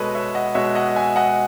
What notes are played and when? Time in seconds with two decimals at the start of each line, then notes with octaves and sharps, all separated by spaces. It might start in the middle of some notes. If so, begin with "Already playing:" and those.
Already playing: B2 G#3 A4 B4 C#5 D#5
0.15 C#5 E5
0.35 D#5 F#5
0.55 B2 G#3 C#5 E5
0.75 D#5 F#5
0.96 E5 G#5
1.16 D#5 F#5